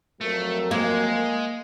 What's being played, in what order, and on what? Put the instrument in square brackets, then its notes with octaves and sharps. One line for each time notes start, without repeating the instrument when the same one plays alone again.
[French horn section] F2 F#3 A#4 [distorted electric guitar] A3
[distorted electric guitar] G#3 [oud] A#3